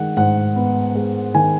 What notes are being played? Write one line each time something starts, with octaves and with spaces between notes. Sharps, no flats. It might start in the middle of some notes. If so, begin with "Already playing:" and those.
Already playing: D#3 G#3 F#5
G#2 F#5
B3
G#3
D#3 G#5